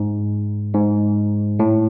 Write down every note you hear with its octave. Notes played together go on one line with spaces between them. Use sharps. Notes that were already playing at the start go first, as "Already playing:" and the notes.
Already playing: G#2
G#2
A2